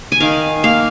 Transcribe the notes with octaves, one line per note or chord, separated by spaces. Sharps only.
G#5
D#3 F5
A#3 F5